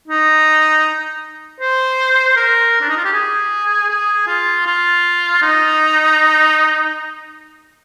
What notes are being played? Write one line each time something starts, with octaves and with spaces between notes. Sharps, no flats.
D#4
C5
A#4
D4
D#4
F4
G4
G#4
G#4
F4
F4
D#4